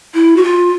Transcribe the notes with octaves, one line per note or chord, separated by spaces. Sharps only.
E4
F#4
F4